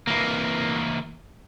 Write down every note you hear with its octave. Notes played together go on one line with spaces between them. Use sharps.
E3 A#3